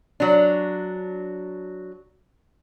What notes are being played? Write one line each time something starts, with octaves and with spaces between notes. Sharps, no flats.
F#3 D4